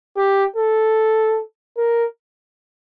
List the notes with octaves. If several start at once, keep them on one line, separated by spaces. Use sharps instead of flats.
G4
A4
A#4